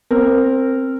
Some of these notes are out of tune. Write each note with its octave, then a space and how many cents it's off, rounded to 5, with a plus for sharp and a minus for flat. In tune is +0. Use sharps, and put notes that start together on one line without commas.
C4 +15 A#4 -15